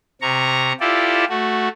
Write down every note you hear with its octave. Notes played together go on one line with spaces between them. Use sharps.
C3 A#5 C#6
E4 F4 G4 A4 D5
A3 F#4